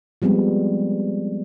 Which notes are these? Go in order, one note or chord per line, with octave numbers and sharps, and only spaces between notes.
F3 G3 G#3 B3 C4